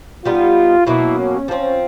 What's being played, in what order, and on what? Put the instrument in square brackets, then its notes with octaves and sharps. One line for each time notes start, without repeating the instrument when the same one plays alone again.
[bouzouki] G3 B3 D#4 [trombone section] F4
[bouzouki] B2 F#3 A#3 [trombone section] E4
[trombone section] C#4
[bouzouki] F3 A3 C4 [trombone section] C#4